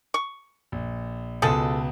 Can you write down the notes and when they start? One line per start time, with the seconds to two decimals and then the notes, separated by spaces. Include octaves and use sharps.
0.14 C#6
0.72 A#1
1.42 C#2 B2 F3 G#3 A4 D#6